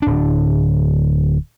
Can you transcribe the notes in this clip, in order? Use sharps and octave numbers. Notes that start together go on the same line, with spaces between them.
D1 D4